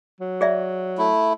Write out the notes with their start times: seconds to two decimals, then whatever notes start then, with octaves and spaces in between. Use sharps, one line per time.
0.20 F#3
0.41 G#4 D5 E5
0.98 A3 E4